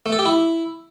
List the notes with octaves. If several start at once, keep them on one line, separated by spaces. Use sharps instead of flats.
A3
A4
G4
E4